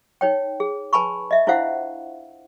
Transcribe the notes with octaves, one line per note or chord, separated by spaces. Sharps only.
D#4 C#5 G5
G#4
B4 G#5 A5 B5 C#6
D#5 E5
D4 E4 F4 C5 F5 F#5